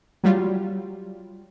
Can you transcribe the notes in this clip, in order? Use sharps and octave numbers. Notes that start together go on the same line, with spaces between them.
F#3 G3 F4